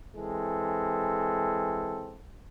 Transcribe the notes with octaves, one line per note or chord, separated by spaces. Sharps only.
E3 G#3 C4 A4